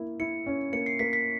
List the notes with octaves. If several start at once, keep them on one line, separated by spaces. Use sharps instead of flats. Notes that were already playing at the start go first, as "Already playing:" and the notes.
Already playing: A#3 E4
E4 C#7
C#4
A#3 C#7
C7
A#3 B6
B6